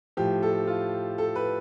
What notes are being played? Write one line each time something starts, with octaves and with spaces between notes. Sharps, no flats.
A2 F3 G4
A4
F4
A4
B4